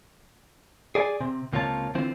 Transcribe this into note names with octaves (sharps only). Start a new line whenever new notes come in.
G#4 D5 G#5
C3 C4
C#2 C3 A#3 F4 C#5 A5
D3 E3 C4 F4 C5